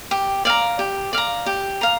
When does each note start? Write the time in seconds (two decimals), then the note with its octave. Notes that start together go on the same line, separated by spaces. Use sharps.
0.11 G4
0.45 D5 F5 A#5
0.79 G4
1.13 D5 F5 A#5
1.46 G4
1.81 F5 A#5